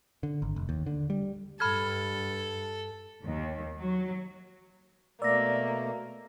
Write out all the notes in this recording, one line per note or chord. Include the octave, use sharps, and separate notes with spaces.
D3
G#1
F1
D#2
D3
G3
G2 A4 B5 F6 G#6
D#2
F#3
B2 A3 A#3 D5 E6 A#6